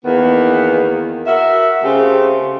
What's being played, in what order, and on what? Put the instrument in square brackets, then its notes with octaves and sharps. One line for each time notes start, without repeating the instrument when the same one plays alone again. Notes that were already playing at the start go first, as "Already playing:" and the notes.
[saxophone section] E2 D#3 A#3 B3
F#4 A#4 E5
C#3 A3 C4 F4 G4